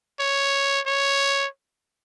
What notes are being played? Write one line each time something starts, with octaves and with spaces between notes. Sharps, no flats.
C#5
C#5